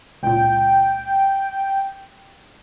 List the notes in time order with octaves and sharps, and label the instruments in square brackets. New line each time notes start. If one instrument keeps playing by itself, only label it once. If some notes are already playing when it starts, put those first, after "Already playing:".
[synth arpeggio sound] C#2 A#2 [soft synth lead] G5